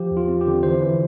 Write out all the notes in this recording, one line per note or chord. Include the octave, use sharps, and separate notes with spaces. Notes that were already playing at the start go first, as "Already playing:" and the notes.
Already playing: F3 G4
E2
F4
C4
G4
D3
E3 C5
E3